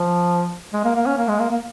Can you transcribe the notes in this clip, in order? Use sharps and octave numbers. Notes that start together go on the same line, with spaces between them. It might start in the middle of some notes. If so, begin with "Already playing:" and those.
Already playing: F3
G#3
A#3
A#3
C#4
A#3
G#3
A#3
A#3